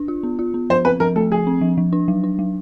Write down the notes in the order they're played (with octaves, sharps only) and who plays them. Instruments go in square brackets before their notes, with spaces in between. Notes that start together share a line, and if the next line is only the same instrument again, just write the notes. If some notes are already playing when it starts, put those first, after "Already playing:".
Already playing: [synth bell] D4
F4
B3
F4
B3
[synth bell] F3 [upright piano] C5
[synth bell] C4 [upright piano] B4
[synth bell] F3 [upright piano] A#4
[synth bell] A3 [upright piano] A4
[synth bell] F3 [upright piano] G#4
[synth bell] C4
F3
F3
D4
F#3
D4
F#3